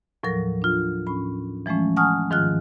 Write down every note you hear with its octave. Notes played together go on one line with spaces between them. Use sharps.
D#2 A2 F3 F#3 A#4 A#6
D4 F4
A2 C#4 B5
E3 F3 G#3 A3 C#4
F#5 G#5 A5 C#6 D#6 F6
G#2 D#3 F3 F4 F6 F#6